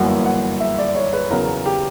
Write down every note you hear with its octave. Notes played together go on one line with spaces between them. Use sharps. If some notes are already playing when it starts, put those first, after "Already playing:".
Already playing: G1 F#2 E3 A#3 F#5
F#5
E5
D5
C#5
B4
E2 C#3 F#3 B3 A#4
G4